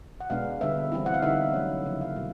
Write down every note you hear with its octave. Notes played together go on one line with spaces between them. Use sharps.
F#5
B2 G#3 B3 D4 F5
D3 G3 B3 E5
E3 G3 C4 E4
F#5
F5
D3 G3 B3 D#4 E5
F#3 A3 C#4
C#3 F3 A#3 D#4
F5
B2 G3